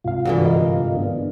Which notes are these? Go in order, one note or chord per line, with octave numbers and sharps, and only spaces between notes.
C2 G#2 C3 F4 F5
G2 D3 E3 F#4
A#4 D#5 F5
B3 D4